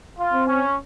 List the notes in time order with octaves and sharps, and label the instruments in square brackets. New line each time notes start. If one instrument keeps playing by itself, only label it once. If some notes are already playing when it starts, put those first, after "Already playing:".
[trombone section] F4
[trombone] C4
[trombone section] C#4